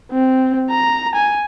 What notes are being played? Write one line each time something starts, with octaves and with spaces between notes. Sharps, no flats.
C4
A#5
G#5